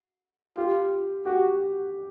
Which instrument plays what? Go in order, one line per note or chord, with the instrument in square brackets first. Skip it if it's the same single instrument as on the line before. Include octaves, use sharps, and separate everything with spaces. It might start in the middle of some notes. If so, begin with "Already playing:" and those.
[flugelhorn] F4 [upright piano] G4
[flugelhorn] F#4 [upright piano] G4